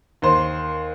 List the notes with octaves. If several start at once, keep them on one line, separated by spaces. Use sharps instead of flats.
D#2 C5